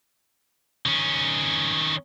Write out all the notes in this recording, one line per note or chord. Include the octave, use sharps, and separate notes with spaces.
D#3 C#4